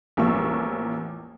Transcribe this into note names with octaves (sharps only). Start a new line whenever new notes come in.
A1 E2 F3 A#3 C#6 E6